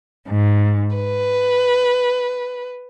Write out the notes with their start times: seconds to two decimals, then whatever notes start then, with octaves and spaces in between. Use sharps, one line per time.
0.27 G#2
0.97 B4